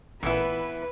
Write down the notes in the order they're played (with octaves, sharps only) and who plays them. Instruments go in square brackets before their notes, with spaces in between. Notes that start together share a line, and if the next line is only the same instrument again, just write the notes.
[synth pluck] A1 A#2 [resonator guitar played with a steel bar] E3 B3 E4 [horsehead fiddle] B4